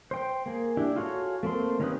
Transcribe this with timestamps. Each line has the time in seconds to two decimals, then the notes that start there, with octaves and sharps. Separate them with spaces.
0.11 C5 G5
0.46 A#3 G#4
0.77 D4 E4 G4
0.96 F4 F#4 G#4 A4 C#5
1.43 A3 A#3 C4 C6
1.80 D#3 C#4 G4 B4 D#6